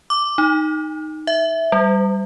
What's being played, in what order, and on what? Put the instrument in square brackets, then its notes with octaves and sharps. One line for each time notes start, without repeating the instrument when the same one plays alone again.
[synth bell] D6
D#4
E5
G3